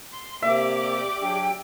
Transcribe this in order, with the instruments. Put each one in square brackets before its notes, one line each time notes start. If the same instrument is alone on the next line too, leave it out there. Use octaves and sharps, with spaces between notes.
[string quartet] C6
[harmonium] C3 A#3 [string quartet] G4 D5 D6 [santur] E5
[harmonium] F#3 D4 G#4 [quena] G5